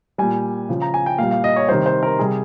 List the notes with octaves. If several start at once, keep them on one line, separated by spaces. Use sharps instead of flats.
A#2 G3 G#5
C#3 F3
A#5
G#5
G5
A#2 G3 F5
F5
D#5
C#5
C3 D#3 G3 C5
C5
A#4
C3 G3 G#4